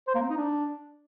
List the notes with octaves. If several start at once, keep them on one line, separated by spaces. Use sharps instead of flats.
C5
A#3
C4
D#4
D4